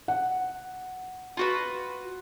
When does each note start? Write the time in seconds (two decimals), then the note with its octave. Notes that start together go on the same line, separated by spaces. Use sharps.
0.08 F#5
1.37 F4 F#4 B4